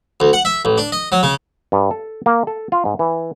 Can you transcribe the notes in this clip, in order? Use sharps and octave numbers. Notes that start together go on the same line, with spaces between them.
D2
F#5
E5
A1
D4
D#5
F#3
C#3
G2
A4
A#3
A4
F4
G#2
E3